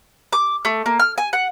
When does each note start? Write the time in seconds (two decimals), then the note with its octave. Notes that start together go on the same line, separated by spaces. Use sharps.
0.33 D6
0.65 A3
0.86 A#3
0.99 F6
1.18 G#5
1.33 F#5